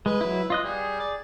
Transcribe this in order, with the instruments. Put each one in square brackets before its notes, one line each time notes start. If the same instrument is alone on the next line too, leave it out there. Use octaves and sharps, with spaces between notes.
[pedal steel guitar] G#3 [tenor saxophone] B4
[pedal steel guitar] F#3 E4
F4 D#5 F#6
[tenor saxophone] G3 [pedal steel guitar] G#4
[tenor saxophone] D5